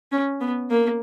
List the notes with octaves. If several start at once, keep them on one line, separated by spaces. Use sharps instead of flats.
C#4
B3
A#3